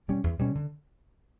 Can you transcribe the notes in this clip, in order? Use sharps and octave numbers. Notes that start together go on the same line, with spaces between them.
B2 G3 C#4
E2
B2 G3 C#4
D3